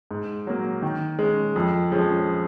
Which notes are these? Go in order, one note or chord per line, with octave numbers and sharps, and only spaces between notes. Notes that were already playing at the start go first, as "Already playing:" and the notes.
G#2
F#3 A#3
D#3
G#3 C#4
F2
F3 G#3 C#4